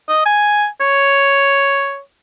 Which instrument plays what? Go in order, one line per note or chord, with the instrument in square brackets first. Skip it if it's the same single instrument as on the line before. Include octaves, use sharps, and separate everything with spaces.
[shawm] D#5
G#5
C#5